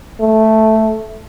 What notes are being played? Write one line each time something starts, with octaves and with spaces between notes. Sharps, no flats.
A3